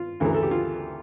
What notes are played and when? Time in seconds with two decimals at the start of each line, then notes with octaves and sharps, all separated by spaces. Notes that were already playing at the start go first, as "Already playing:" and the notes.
Already playing: F4
0.20 D2 C#3 E3 A3 A#4
0.34 A4
0.43 G4
0.51 F4